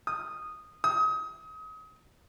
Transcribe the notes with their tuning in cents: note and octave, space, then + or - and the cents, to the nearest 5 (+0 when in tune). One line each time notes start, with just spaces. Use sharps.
D#6 -10
D#6 +30